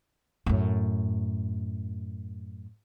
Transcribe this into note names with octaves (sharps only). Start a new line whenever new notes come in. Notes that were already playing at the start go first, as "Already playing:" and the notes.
F#2 A2